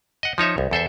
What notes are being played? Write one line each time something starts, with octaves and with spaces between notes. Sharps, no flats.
D#5 F#5
F3 D#4 C#5 E5
C2
E2 A4 C5 E5